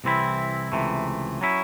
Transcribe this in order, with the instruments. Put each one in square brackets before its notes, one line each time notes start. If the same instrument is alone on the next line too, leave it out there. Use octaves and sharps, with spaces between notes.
[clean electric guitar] C2 C3 E3 C4 E4
C#2 C3 E3 A3
F#3 C#4 E4